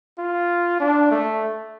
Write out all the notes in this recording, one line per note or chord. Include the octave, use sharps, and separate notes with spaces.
F4
D4
A3